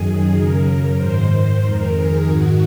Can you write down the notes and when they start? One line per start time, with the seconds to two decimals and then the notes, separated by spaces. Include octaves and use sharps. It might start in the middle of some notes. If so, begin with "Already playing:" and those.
Already playing: F#2 D#3 G#4
0.32 F#2 C#3 A#4
0.96 G#2 D#3 C5
1.60 F2 D#3 A#4
1.93 G#4
2.25 G#2 D#3 F#4